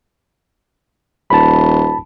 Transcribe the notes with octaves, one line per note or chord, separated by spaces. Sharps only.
D#1 A5 B5